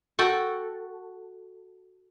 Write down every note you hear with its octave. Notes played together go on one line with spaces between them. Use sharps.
F#4 A4 G5